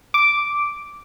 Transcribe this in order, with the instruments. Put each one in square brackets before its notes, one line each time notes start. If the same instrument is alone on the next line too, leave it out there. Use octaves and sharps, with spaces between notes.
[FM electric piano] D6